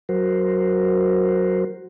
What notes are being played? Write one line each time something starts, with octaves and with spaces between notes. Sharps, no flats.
F#3 F#4 A#4 C5